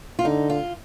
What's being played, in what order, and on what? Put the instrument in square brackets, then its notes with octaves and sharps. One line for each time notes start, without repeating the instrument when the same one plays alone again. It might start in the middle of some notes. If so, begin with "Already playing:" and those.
[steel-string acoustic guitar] F4
[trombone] D3 [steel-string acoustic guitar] D#4
[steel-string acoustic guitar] F4